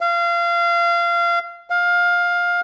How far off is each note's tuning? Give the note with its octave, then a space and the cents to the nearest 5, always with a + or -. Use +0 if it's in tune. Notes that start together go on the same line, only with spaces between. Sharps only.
F5 -25
F5 +15